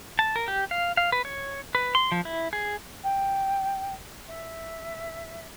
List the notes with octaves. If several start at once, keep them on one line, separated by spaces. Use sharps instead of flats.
A5
A#4
G4
F5
F5
B4
C#5
B4
C6
F3
E4
G#4
G5
E5